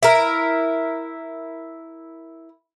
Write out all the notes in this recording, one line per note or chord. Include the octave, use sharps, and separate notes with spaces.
E4 A#4